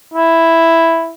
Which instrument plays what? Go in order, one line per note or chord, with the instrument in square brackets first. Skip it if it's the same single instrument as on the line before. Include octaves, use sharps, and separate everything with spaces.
[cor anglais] E4